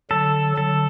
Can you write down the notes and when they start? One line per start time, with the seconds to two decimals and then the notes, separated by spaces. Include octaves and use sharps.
0.10 D3 F#3 A4
0.57 D3 F#3 A4